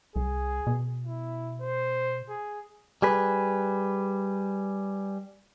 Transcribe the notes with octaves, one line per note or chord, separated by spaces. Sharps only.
C2 G#4
B2
E4
C5
G#4
G3 G#4 B4